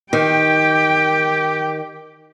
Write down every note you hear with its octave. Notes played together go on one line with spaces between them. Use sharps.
D#3 G4 G5